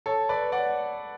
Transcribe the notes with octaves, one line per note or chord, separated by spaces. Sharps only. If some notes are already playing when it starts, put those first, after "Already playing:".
A4 C#5
B4 D5
D5 F#5